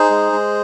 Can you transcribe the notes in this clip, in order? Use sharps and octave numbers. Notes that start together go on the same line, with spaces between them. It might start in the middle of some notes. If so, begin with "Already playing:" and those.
Already playing: D#4 G#4 C5
G#3
G#3